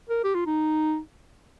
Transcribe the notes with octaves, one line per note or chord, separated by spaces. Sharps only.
A#4
G4
F4
D#4